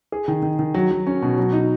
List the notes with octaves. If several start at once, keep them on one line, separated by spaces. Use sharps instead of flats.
G#4
D#3
D#3
D#3
F#3
F#3
C#4
B2
F#3
D#4